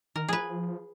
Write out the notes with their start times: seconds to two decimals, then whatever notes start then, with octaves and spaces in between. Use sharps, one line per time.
0.16 D#3 A#4
0.28 F3 G#4 B4